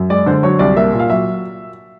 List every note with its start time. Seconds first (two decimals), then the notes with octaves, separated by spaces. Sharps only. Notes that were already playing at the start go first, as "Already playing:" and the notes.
Already playing: F#2
0.10 G#3 D5
0.26 D3 C5
0.43 F#3 C#5
0.59 C2 D5
0.76 A#3 E5
0.92 A#2
0.99 F5
1.10 F#3 E5